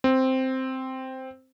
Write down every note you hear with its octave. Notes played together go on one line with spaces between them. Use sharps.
C4